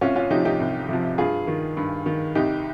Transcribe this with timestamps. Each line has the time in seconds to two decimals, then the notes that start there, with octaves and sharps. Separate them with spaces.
0.01 C2 C#4 F4
0.16 C#4 F4
0.30 C3 F3 D#4 G4
0.45 D#4 G4
0.60 C2
0.89 C3 F3
1.18 G2 F4 G#4
1.47 D#3
1.77 G2
2.06 D#3
2.35 C2 D#4 G4